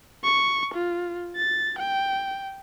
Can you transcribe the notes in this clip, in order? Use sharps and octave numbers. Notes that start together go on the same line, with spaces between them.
C#6
F4
A6
G5